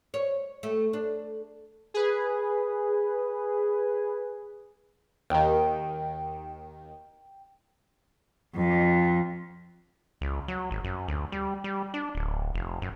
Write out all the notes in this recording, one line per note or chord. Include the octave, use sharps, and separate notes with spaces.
C#5
A3
D4
G#4 B4
D#2 D#3 G5
F2
C#2
F#3
G#1
F#2
D2
G3
G3
D4
D1
F1
F#2